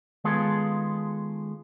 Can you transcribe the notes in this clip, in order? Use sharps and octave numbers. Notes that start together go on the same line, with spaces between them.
D#3 G#3 B3 F4 G#4 A4